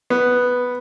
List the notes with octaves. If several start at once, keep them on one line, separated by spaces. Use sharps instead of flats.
B3